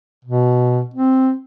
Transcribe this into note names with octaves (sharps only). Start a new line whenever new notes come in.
B2
C4